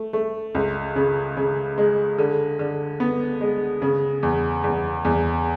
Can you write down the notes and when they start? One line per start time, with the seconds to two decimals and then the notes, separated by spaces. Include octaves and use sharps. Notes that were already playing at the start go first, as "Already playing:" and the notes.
Already playing: A3
0.13 A3
0.55 C#2
0.96 C#3
1.37 C#3
1.78 G#3
2.18 D3
2.59 D3
3.00 B3
3.41 G#3
3.82 C#3
4.23 E2
4.64 E2
5.05 E2